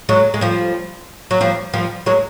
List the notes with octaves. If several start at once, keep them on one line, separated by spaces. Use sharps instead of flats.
F#3 G#3
G#3
F3 G3
F#3
F3 G3
F3 G3
F#3 G#3